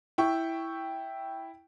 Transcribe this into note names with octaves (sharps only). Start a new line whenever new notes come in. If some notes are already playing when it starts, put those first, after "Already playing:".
E4 G5 C#6